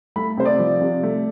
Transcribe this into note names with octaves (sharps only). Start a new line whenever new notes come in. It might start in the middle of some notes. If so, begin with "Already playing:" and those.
A3 B5
C3 C5
D5
F3
C3
A3